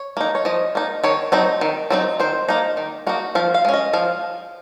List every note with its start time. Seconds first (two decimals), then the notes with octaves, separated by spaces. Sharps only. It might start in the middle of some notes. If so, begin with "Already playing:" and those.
Already playing: C#5
0.17 A#3 D#4
0.35 C#5
0.45 F3 D#5
0.75 A#3 D#4
1.04 D#3 C#5
1.32 F#3 C4 D#4
1.61 D#3
1.90 F#3 C4 D#4
2.20 D#3 C5
2.49 A#3 D#4
2.77 D#3
3.07 A#3 D#4 F#4
3.35 F3 F5
3.54 F5
3.65 G#3 C#4
3.74 D#5
3.93 F3 F5